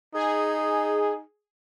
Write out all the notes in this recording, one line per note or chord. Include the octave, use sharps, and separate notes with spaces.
D#4 G#4